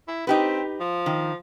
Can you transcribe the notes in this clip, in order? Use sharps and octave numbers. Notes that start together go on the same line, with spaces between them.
E4
C4 D#4 G4 B4
F3
D#3